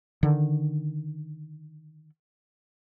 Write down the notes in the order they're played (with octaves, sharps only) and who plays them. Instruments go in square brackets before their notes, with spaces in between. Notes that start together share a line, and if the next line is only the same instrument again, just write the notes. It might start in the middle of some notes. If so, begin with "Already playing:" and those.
[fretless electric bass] D3 D#3